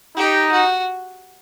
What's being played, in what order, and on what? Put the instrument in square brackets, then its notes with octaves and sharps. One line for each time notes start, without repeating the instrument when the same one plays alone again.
[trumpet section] D#4 [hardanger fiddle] G4
[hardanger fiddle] F#4